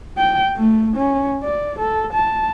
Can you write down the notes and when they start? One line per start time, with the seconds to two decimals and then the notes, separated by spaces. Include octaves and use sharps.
0.18 G5
0.56 A3
0.96 C#4
1.43 D5
1.79 A4
2.13 A5